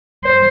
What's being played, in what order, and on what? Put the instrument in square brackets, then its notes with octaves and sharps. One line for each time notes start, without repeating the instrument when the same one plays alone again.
[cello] C5